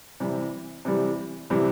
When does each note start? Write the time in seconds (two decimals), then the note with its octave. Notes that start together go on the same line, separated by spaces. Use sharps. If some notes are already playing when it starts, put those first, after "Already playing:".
0.20 C3 E3 G3
0.85 C3 E3 G3
1.50 C3 E3 G3